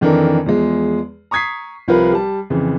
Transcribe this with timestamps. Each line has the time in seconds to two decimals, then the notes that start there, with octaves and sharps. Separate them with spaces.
0.01 F2 D#3 E3 D4 A4 A#4
0.46 E2 F3 G#3
1.31 A#5 C#6 D#6 G#6 B6 C7
1.88 C2 F3 F4 A#4 B4 F5
2.12 G3 A5
2.50 F2 C#3 E3